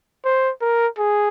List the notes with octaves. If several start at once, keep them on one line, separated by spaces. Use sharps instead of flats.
C5
A#4
G#4